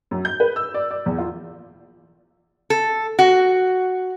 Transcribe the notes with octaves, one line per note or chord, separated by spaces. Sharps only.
F#2
G6
B4
E6
D5
D5
E2
F4
A4
F#4